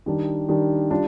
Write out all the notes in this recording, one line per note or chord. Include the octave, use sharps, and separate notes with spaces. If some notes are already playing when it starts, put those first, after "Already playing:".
D#3 G3 D4
D#3 G3 D4
G3 D4 F4